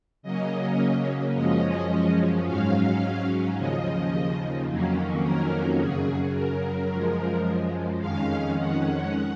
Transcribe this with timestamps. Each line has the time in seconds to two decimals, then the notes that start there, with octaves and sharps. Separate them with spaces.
0.23 C#3 F#3 A#3 C#4 D#5
1.34 F#2 F3 G#3 C#4 D#5
2.46 G#2 F#3 C#4 F5
3.56 D#2 C#3 F3 D#5
4.67 F2 D#3 F#3 A#3 C#4
5.22 A#4
5.78 F#2 C#3 F#3 G#4
6.33 A#4
6.90 F#2 F3 G#3
8.00 F2 D#3 G#3 C#4 F5
8.56 F#5